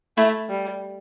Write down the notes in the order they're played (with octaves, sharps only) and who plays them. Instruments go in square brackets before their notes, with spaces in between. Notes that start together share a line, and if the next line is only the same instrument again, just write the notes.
[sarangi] A3 [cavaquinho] E4
[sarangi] G3